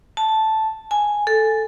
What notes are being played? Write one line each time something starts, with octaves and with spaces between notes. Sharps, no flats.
A5
G#5
A4